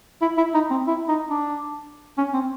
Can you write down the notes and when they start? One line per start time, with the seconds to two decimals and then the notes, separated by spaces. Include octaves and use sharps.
0.22 E4
0.38 E4
0.54 D#4
0.70 C4
0.87 E4
1.09 D#4
1.30 D4
2.18 C#4
2.34 C4